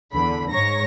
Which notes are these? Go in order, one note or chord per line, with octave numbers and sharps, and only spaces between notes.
E2 D3 B5
G#2 G#3 C#5 A#5 C#6 A#6